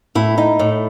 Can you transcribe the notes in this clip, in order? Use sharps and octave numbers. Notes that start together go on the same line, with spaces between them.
A2 E4
D#4
A2